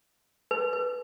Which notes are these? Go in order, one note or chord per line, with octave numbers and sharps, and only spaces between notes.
B4
B4